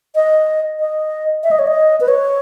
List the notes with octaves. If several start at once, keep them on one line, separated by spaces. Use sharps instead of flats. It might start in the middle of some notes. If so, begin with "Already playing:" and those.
D#5
D#5
E5
D#5
C#5
D#5
B4
C#5